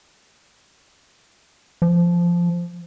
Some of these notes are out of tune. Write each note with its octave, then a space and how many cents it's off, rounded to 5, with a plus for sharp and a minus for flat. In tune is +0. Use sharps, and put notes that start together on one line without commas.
F3 -10